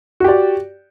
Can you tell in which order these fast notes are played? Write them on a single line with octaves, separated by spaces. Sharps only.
F#4 G4 D5